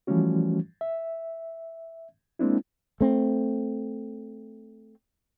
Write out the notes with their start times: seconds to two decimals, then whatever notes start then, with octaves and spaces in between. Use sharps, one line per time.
0.07 E3 F3 G3 A3 C#4 F#4
0.81 E5
2.39 G#3 A#3 C4 D4 E4
3.01 A3 C4